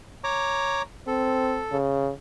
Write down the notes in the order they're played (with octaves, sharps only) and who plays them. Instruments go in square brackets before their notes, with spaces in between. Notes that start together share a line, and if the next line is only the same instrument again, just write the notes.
[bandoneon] C#5 A#5 D6
[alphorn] C4 [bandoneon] A4
[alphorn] C#3